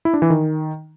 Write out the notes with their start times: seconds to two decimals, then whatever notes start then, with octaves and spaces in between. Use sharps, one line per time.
0.05 E4
0.14 D4
0.22 E3
0.30 D#3